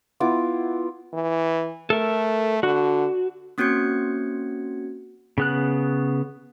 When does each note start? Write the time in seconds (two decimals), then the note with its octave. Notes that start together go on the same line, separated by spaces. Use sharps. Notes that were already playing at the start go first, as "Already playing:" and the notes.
0.20 B3 E4 F4 D6
1.13 E3
1.90 A3 A4 A#4
2.63 D3 F#4
3.58 A#3 C4 C#4 F#4 G#6 C#7
5.38 C#3 B3 F#6